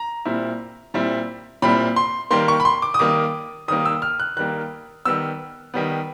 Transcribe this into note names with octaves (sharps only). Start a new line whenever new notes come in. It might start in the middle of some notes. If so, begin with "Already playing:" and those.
Already playing: A#5
A#2 G3 C4 E4
A#2 G3 C4 E4
A#2 G3 C4 E4 B5
C6
D#3 G3 A#3 C6
C#6
B5
C6
D6
D#6
D#3 G3 A#3 D6
D#3 G3 A#3 D#6
E6
F6
F#6
D#3 G3 A#3 F#6
D#3 G3 B3 E6
D#3 G3 B3